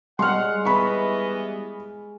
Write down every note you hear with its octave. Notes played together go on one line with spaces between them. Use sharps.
G3 G#3 F#5 C6 F6
E3 B3 D#5 B5 C#6